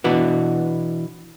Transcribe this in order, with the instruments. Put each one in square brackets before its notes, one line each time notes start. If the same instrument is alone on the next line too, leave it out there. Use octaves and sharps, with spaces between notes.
[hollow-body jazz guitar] B2 E3 D4 F#4